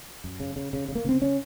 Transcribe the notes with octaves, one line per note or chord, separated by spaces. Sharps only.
F#2
C#3
C#3
C#3
C#3
A#3
C#3 C4
C#4